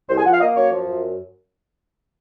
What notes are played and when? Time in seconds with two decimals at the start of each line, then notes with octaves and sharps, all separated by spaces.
0.09 C2 C5
0.18 G#5
0.25 F3 F#5
0.34 F5
0.41 A#3 D#5
0.57 F#2 C#5
0.72 F3
0.88 F#2